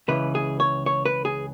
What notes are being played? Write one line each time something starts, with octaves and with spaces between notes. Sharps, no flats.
C#2 C#3 E3 B4
G#4
C#5
C#5
B4
G#4